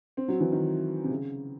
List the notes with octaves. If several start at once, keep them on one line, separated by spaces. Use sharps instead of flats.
C4
F#3
E3
D#3
C3
C#3